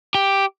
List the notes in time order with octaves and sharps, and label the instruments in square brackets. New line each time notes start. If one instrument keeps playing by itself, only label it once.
[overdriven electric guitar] G4